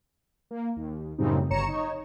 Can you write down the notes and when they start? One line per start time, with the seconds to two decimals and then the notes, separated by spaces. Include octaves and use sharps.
0.51 A#3
0.77 D#2
1.18 F#2 A2 C#3 G3 C4 D#4
1.50 G1 C#5 A#5 C#7 E7
1.68 D#4 C#5